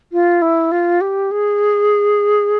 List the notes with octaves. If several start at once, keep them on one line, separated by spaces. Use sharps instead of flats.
F4
E4
F4
G4
G#4